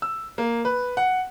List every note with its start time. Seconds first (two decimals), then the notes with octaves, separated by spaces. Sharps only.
0.02 E6
0.38 A#3
0.65 B4
0.97 F#5